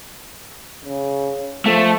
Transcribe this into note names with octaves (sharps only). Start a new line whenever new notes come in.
C#3
F3 A3